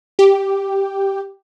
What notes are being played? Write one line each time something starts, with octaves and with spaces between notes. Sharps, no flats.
G4